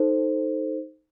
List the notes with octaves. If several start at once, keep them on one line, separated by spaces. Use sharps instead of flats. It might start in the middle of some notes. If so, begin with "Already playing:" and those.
Already playing: D#4 A4 C5